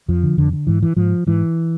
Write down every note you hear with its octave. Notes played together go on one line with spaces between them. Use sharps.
F2 F3
D3
F2 D3
D3
G#2 E3
E3
G#2 F3
G#2 E3